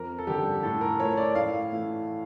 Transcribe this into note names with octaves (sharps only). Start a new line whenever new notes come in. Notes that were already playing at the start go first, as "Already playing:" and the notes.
Already playing: F2 A#4
A4
D3 G3 G4
A2 A4
A#4
F3 A3 C#5
C#5
D5
A2 F5
E3 A3